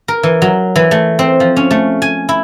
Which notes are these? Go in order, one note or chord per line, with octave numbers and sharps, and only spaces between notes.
A#4
E3
F#3
E3
A3
C4
F3
C#4
A3
G#5
E4